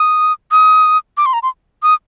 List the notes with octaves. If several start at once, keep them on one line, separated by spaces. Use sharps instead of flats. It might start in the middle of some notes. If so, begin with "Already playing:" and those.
Already playing: D#6
D#6
D6
C6
A#5
C6
D#6